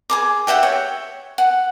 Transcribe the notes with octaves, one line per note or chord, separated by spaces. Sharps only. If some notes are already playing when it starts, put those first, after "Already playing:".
G#4 A#4 D6
G4 E5 F#5 G5
C#5
F#5